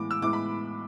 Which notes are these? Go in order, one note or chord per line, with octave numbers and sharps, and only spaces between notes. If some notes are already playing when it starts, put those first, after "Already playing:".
Already playing: A2 E3 G#3 B3 D6
E6
A2 E3 G#3 B3 D6
B5